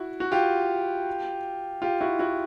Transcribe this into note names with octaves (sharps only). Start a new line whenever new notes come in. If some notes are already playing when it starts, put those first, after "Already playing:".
Already playing: E4 F#4
F#4
F4 G4
F4 G4
E4 F#4
E4 F#4